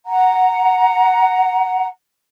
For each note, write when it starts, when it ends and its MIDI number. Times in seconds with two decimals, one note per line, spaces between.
0.06 1.87 78
0.06 1.87 82